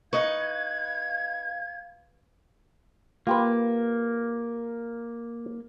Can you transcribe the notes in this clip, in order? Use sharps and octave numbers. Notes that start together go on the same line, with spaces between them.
D#4 B4 D#5 F5 C#6 G#6
A#3 F4 G4 B4